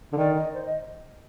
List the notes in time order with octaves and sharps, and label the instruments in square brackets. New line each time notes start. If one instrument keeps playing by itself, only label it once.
[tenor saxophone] D3
[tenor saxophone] D#3 [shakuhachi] D5
[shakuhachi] D#5
C5
D#5